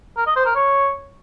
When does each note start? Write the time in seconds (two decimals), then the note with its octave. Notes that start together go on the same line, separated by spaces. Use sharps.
0.17 A#4
0.26 D#5
0.36 C5
0.46 A#4
0.55 C#5